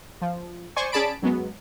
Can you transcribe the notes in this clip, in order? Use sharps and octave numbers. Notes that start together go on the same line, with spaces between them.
F3
C5 D5 G#5 C#6
C#4 G#4 D5 A5 B5 D7
F#2 F#3 G#3 B3